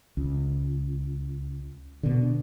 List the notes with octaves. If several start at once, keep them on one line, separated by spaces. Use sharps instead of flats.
C#2
B2 D3